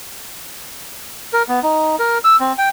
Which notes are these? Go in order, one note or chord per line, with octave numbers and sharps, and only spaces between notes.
A#4
B3
D#4
A#4
E6
C4
G5